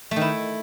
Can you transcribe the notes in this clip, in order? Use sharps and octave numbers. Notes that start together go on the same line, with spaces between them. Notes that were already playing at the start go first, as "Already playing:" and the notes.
A3
D#3
E4